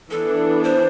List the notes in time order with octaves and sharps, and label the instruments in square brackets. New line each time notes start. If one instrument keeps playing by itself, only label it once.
[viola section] E3 B3 D4 [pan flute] A4
[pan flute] C5